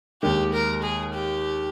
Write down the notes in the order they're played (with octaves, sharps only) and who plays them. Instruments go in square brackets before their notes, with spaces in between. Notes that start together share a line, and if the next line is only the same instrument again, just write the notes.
[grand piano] D#2 D#3 G#3 [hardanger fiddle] G4
[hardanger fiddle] A#4
G#4
G4